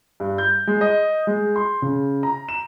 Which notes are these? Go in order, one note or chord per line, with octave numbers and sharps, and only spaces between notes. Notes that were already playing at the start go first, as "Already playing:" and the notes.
G2
G6
G#3
D#5
G#3
C6
C#3
A#5
E7